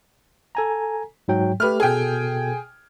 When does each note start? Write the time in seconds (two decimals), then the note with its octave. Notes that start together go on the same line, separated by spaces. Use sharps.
0.55 A4 G#5 A#5
1.28 G#2 F#3 G5
1.60 A3 G4 B4 F6
1.80 B2 G#4 A4 G5